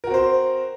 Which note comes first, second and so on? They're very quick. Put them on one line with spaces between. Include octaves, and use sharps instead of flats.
A#4 F#4 C4 C5